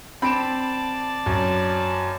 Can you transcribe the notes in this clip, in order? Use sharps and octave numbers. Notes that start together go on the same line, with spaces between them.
C4 D5 A5 B5 D7 E7
F#2